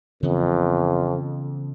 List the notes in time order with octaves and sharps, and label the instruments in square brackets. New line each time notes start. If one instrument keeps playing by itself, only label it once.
[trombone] F2 [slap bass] C#3 E3 B3